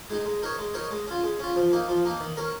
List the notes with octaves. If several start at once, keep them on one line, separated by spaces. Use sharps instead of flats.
G#3 D#4
G#3
D#4 A#4 C#5
G#3
D#4 A#4 C#5
G#3
C#4 F4
G#3
C#4 F4
F3
A#3 D#4
F3
A#3 D#4
D#3
C#4 A#4